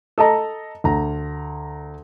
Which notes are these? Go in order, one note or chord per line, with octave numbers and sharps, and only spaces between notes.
A4 D#5 A5 A#5
D2 A#5